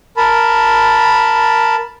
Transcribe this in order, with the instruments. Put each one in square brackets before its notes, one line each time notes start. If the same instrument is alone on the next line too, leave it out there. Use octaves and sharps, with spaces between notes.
[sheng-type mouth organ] A#4 A5 B5